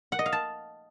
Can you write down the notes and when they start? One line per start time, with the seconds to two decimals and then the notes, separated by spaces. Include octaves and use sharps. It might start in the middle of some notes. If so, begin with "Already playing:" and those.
0.12 F#5
0.19 D#5
0.26 F5
0.32 A5